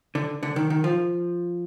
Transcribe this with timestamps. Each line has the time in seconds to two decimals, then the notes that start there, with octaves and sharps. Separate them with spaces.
0.15 D3
0.43 D3
0.56 D#3
0.70 D#3
0.84 F3